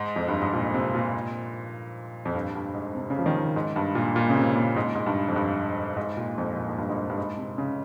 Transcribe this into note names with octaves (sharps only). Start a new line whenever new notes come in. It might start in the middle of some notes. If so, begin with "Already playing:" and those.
Already playing: G#2
F2
G2
G#2
A#2
C3
A#2
F2
G2
G2
G#2
C3
C#3
F3
D#3
G#2
G2
A#2
A#2
C#3
C3
A#2
G#2
G#2
G2
F2
G2
G#2
A#2
F2
A#2
G#2
G2
G#2
G2
G#2
C3
C#3